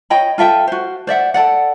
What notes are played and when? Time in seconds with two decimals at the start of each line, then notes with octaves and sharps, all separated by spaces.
0.10 C#5 D#5 G5 B5
0.38 F4 A4 E5 G5
0.67 F#4 C5
1.07 C5 D5 E5 F#5
1.34 A4 D5 F#5